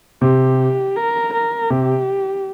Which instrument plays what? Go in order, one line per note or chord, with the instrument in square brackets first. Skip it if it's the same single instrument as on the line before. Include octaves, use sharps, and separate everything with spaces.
[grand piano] C3 [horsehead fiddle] G4
[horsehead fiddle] A#4
A#4
[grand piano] C3 [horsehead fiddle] G4